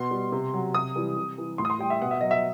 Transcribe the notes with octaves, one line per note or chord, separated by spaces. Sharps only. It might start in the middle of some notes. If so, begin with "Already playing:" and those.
Already playing: B2 C6
G3
C3
F#3
C3 D#6
E3 G3
C3
E3 G3
A2 C6
D#6
C6
G3 G5
E5
B2 F#5
E5
F#3 D#5
E5